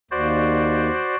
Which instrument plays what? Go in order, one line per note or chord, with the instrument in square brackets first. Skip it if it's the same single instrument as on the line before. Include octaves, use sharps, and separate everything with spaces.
[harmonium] D#2 [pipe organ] F#4 C5 D5